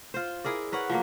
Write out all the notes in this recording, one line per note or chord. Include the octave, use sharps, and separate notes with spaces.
F4 C5
E4 G#4 A#4 D5
A#4 B4 C#5 F#5
F3 F#3 A#3